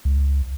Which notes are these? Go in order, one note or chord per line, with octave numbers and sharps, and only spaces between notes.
C#2